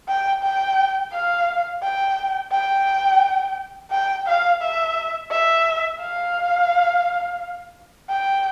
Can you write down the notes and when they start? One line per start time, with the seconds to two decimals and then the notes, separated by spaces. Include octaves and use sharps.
0.08 G5
0.43 G5
1.13 F5
1.83 G5
2.52 G5
3.91 G5
4.27 F5
4.62 E5
5.31 E5
6.01 F5
8.10 G5